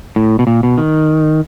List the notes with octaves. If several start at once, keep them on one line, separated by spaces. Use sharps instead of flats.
A2
B2
A#2
B2
D#3